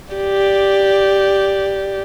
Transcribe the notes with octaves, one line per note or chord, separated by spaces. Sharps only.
G4 D5